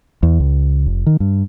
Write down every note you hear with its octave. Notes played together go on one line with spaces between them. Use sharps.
E2
C#2
F1
D#3
G2